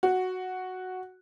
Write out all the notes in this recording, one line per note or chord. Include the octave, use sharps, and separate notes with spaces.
F#4